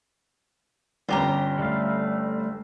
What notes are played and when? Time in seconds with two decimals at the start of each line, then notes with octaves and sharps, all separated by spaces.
1.09 G1 C#4 F4 G4 A#5 G7
1.59 G3 A3 F5